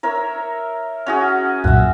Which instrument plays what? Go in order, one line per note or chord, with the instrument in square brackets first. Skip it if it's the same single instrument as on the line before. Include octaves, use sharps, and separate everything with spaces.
[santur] A#4 C#5 E5
[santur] C#4 F#4 G#4 [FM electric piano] F6
[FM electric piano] C2 F#2 A#2 [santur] E5 F#5